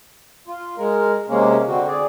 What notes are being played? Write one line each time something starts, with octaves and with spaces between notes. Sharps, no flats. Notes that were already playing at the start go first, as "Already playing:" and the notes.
F4
G#3 A#4
C3 G#3 A#3 C#4
D3 C4 F#4
G#4 D5